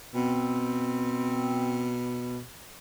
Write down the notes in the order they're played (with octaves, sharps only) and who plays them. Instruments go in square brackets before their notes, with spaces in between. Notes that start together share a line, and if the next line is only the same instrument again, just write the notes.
[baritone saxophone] B2 [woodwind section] C4